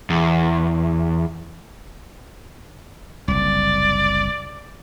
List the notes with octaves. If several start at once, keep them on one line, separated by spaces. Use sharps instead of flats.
E2
F#1 C2 D5